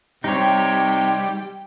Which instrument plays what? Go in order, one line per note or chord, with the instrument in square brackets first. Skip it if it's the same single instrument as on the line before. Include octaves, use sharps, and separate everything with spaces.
[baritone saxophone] C3 [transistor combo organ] G3 [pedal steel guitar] D#4 C#5 [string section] G5